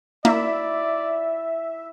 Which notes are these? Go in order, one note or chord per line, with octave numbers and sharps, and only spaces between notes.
A#3 E4 D5 E5